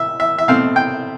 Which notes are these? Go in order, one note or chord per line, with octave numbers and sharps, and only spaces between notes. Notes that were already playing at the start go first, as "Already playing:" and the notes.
Already playing: E5
E5
E5
B2 A3 C4 F5
G5